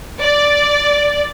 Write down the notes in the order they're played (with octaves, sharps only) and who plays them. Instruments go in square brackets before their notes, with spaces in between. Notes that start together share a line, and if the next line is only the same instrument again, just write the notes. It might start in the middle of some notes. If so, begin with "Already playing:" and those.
[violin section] D5